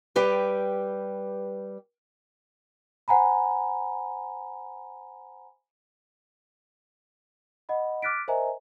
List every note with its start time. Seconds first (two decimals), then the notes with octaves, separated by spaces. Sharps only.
0.16 G3 G4 B4 G5
3.08 C5 F#5 G#5 A#5 B5
7.69 D#5 F#5 B5
8.02 D6 F6 F#6 A6 B6 D7
8.28 A#4 C5 D#5 E5 G#5 A#5